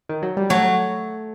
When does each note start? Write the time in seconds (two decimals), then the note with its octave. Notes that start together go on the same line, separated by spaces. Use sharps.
0.09 D#3
0.23 F#3
0.37 G3
0.50 F#3 A3